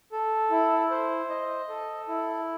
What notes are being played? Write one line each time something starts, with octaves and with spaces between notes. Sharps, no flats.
A4
E4
C5
D#5
A4
E4